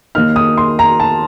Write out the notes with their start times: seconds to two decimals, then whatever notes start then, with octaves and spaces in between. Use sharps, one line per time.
0.15 D#2 D#3 A#3 D#4 F6
0.36 D#6
0.58 C6
0.79 A#5
1.00 A5